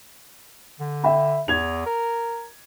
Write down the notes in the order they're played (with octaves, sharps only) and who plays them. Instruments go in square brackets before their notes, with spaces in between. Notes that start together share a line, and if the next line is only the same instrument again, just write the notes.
[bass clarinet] D3
[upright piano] E5 G5 B5
[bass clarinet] E2 [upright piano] G#6 F7
[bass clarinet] A#4